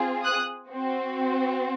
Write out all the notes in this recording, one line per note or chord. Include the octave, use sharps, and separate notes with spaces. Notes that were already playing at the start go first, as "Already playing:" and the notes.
Already playing: C4 F4 G#4
D#6 F#6
C4 F#4